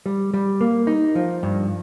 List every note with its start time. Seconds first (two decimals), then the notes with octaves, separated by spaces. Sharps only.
0.06 G3
0.34 G3
0.61 A#3
0.87 D#4
1.15 F3
1.43 G2